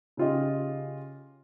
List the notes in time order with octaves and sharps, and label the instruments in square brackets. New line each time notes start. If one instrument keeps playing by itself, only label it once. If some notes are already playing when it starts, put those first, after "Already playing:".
[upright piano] C#3 C#4 F4 G4 D#5